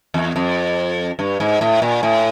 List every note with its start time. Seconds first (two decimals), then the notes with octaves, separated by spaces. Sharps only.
0.14 E2
0.36 F2
1.19 G2
1.40 G#2
1.61 A2
1.82 A#2
2.03 A2